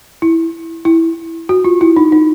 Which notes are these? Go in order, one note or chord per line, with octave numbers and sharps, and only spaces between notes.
E4
E4
F#4
F4
E4
D#4
D#4